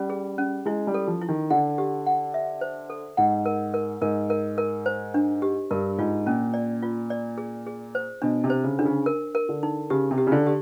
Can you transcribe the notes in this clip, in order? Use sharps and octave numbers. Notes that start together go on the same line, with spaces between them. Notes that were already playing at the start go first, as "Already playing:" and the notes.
Already playing: G3 C#4
G#4
C#4
G#3 E4
G3
A4
F3
E4
D#3
D3 F#5
G4
F#5
E5
C5
A4
G#2 F#5
A#4
A#4
G#2 A#4
A#4
A#4
C5
D4
G4
G2 A#4
G#2 F4
A#2 C#4
D5
F4
D5
G#4
G#4
C5
B2 D4
C3
C5
C#3
D3 D4
C#3
A#4
A#4
D3
D#4
C#3 G4
C3
G4
C#3
D3
G4